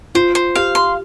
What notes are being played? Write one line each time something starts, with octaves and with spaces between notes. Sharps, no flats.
F4 C5
C5
G4 F5
C6